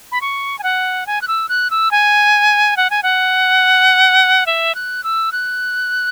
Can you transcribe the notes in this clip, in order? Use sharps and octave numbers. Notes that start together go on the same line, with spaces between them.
B5
C#6
G#5
F#5
G#5
F#6
E6
F#6
E6
G#5
F#5
G#5
F#5
E5
F#6
E6
F#6